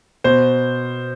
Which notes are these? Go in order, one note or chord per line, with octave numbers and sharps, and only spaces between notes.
B2 C5